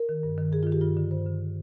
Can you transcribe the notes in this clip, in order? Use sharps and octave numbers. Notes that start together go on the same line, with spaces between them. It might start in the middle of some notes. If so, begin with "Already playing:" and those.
Already playing: A#4
D#3
G2
D#3
G2 G#4
F4
D#3
G4
G2 F4
D3
G2 C5
D3